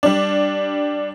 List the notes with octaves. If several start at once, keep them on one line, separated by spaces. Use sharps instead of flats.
G3 D4